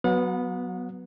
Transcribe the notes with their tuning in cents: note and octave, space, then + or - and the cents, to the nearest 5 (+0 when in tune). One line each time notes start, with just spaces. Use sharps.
F#3 +0 B3 +0 F#5 -40